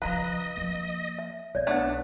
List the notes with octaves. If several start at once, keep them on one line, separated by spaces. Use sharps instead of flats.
C#3 F3 B4 D#5 F5 A#5 B5
F3 A#3
E5
B1 C#5 D5
A3 B3 D4 F#5